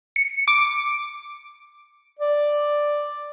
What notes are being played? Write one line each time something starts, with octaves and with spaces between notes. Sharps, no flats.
C#7
D6
D5